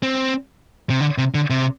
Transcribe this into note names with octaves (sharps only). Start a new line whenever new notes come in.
C4
C3
D3
C3
D3
C3